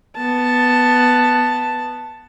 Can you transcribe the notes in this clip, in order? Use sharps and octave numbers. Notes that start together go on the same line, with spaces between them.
B3 A5